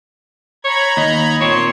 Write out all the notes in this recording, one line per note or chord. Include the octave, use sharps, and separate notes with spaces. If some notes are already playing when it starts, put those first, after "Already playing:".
C#5 A#5 B5 G#6
D#2 D#5
A#2 C4 C#5 C6